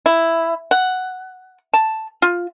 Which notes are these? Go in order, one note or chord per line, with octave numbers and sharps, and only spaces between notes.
E4
F#5
A5
F4